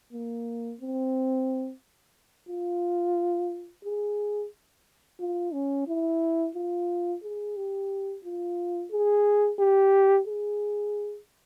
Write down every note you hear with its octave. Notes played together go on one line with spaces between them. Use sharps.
A#3
C4
F4
G#4
F4
C#4
E4
F4
G#4
G4
F4
G#4
G4
G#4